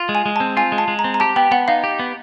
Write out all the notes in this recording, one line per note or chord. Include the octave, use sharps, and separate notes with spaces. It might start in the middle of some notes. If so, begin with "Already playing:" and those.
Already playing: F4
G#3
G#5
G#3
A5
C4
F4 G#5
G#3
A5
G#3
A#5
C4
A#5
G4 A5
B3 G5
B3 F#5
D#4 F5
G4
B3